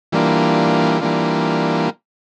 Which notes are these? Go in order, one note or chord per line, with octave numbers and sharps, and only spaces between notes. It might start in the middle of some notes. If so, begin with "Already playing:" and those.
E3 G3 A#3 D4 F4
E3 G3 A#3 D4 F4